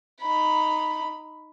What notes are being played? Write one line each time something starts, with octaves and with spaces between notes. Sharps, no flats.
D#4 B5